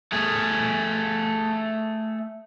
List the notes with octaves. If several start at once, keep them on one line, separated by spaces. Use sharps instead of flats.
A3 G#4